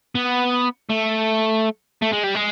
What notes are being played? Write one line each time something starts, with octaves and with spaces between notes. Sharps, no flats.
B3
A3
A3
G#3
G3
G#3